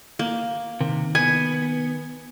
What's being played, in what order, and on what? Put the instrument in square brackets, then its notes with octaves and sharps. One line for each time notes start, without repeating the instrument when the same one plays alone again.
[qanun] A#3
[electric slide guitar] C3 [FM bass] D#3
[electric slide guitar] B3 [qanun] G#5